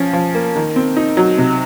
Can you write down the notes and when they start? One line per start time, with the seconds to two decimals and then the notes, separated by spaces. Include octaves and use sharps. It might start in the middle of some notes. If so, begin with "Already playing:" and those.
Already playing: F3 C#4
0.13 F3
0.35 A#3
0.56 D#3
0.76 C4
0.96 D#4
1.17 F#3
1.38 C3